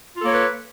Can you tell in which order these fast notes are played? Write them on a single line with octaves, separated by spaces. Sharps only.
F4 A4 A#3 C#5 B4